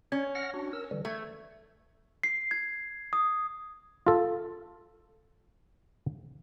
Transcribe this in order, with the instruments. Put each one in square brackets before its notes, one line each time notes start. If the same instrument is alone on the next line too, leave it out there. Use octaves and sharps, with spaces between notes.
[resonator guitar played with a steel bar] C#4 [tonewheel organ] C#5
[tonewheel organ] F#5 F6 A#6
D4 F#4
A#4 E6
D3 E3 G3
[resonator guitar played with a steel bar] A3 [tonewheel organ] G#6
[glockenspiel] C7
G#6
D#6
[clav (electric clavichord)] F4 A4